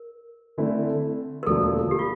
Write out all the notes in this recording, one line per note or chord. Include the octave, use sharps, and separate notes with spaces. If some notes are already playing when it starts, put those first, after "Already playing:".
Already playing: A#4
D3 A3 C4 E4
A#4
E1 D2 D3 F3 A#3 A4
G4
F4